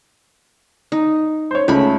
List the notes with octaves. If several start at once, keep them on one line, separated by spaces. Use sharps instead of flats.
D#4
C5 C#5
C#2 A3 B5